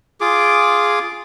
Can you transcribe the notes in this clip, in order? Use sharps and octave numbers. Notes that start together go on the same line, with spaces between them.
F4 G#4 D6